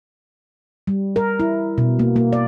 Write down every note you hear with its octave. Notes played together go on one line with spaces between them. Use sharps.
G3
A#4
E4
B2
A#3
A#3
D5